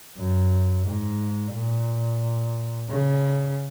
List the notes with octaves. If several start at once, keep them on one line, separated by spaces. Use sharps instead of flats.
F#2
G#2
A#2
C#3